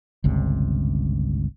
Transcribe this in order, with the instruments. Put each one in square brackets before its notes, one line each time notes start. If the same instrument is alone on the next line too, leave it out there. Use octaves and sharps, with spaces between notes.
[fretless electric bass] G1 C#2 C3